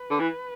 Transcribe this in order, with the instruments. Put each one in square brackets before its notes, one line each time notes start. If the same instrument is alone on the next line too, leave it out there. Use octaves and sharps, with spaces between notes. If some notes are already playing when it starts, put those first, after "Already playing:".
Already playing: [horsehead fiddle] B4
[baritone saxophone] D3
E3